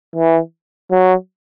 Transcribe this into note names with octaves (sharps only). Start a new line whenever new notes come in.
E3
F#3